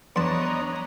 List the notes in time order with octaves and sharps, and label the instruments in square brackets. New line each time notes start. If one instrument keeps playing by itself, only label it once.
[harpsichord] E2 A5 [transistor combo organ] B3 D4 [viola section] C#5 D#5 A#5 [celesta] C6